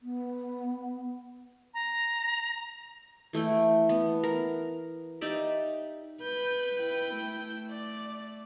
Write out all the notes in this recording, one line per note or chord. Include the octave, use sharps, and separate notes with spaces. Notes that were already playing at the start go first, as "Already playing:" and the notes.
B3
A#5
E3 A3 E4 G5
B3
A#4
D#4 G4 D5 E5
B4 G6
E4 G5
A3
D5